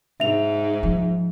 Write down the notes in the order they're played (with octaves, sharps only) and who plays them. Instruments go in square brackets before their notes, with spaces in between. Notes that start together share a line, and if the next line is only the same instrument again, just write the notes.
[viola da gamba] G#2 [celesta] E5 F7
[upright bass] F3